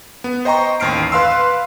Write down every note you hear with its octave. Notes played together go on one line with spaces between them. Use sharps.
B3
C5 D#5 G5 A#5 C#6
A1 D#2 F6 C7 D7
B4 F5 C6 E6